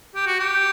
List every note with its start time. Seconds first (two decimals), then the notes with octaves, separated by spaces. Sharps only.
0.15 G4
0.27 F#4
0.40 G4